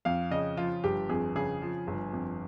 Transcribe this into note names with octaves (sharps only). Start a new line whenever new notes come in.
F2 F5
C#3 D#5
F3 F4
G1 G4
F2 G#4
C#3 G#4
F3
G1
F2